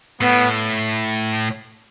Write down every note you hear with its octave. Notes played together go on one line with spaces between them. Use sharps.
A2 B3